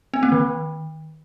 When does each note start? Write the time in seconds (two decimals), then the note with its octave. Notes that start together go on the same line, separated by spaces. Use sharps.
0.14 C4
0.23 A#3
0.32 D#3